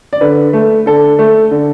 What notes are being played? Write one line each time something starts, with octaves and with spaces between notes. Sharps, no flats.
D5
D3 B4
A3
D3 A4
A3
D3